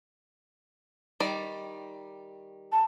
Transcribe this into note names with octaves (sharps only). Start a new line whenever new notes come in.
D#3 G3 D5
A5